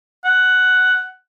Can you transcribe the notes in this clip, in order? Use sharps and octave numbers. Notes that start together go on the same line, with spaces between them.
F#5